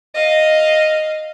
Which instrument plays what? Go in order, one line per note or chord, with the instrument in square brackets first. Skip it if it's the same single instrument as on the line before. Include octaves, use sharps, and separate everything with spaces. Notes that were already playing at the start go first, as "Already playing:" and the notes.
[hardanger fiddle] D#5 F5